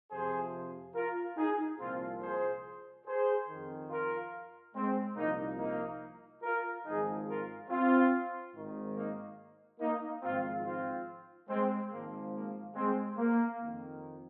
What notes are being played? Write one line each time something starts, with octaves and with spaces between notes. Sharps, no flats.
F2 C3 F3 G#4 C5
F4 A#4
D#4 G#4
C2 A#2 F3 C4 F4
G#4 C5
G#4 C5
F2 D#3
F4 A#4
G#3 C4
C2 A#2 F3 A#3 D#4
A#3 D#4
F4 A#4
G#1 G#2 F3 D#4 G#4
F4 A#4
C4 F4
G#1 G#2 D#3
A#3 D#4
A#3 D#4
G#1 G#2 F3 C4 F4
C4 F4
G#3 C4
G#1 G#2 F3 A#3
A#3
G#3 C4
A#3
F2 D#3